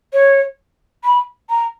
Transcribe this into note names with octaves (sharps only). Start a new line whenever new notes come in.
C#5
B5
A#5